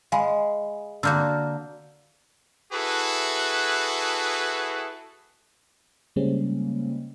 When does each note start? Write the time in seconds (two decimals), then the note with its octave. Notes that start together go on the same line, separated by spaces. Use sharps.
0.12 G#3 F5 G#5 B5
1.03 D3 A#3 F#4 E6 F6 G6
2.72 E4 F#4 G#4 A4 B4
6.16 C#3 G3 G#3 A#3 C4 C#4